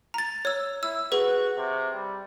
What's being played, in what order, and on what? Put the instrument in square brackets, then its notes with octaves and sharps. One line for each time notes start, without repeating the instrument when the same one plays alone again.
[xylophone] A#5 A6
C#5 E6
[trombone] E4 [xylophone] E6
[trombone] F#4 [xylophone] G#4 B4
[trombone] C3
G3